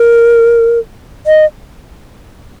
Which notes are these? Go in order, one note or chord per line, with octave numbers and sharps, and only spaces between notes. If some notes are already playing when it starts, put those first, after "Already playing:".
Already playing: A#4
D#5